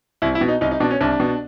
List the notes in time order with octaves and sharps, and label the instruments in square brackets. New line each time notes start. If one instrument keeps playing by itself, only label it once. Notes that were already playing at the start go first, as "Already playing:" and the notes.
[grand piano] C2 E4
E4
B2
D#4
C2 D#4
D#4
B2 D4
C#4
C2 D4
B2